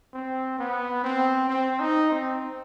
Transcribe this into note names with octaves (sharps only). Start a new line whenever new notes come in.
C4
B3
C4
C4
D#4
C4